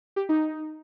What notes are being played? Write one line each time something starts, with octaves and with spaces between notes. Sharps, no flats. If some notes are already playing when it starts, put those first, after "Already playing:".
G4
D#4